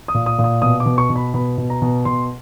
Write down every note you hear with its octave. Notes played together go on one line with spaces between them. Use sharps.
D#6
A#2
D#6
A#2
D#6
B2 D#6
D6
B2
C#6
B2
B5
B2 B5
B2
A#5
B2
B2 C6